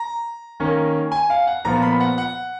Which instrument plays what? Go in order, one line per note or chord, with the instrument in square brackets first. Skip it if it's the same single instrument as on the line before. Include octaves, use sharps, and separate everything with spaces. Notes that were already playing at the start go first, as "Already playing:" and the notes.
Already playing: [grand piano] A#5
D#3 A#3 C#4
G#5
F5
F#5
A#2 F3 B3 F4 A#5
B5
F#5
F#5